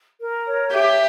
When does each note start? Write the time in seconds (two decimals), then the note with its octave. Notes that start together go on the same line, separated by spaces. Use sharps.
0.20 A#4
0.47 C#5
0.72 G4 E5